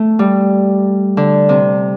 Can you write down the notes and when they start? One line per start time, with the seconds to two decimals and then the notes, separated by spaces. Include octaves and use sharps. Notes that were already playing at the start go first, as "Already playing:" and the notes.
Already playing: A3
0.19 G3
1.17 D3
1.49 C3